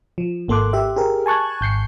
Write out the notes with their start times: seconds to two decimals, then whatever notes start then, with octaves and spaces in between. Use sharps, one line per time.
0.18 F3
0.48 G#1 A#3 A4 C6 D6 F#6
0.73 G4 E5
0.96 G4 G#4 A#4
1.26 G#5 A5 C#6 F#6 G#6
1.61 G#1 G6 C7 C#7